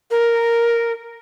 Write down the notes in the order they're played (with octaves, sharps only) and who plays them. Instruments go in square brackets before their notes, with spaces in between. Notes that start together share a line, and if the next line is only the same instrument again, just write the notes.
[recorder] A#4